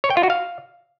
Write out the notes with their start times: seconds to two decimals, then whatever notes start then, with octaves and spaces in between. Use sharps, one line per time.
0.04 C#5
0.10 G5
0.17 F4
0.23 F#4
0.30 F5